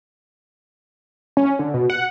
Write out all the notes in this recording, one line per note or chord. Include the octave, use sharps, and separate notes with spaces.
C#4
D3
B2
F#5